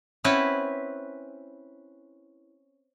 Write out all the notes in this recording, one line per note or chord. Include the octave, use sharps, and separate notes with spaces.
C4 C#4 E4 B4 F#5 G#5